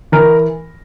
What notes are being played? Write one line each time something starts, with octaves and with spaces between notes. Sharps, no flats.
E3 A#4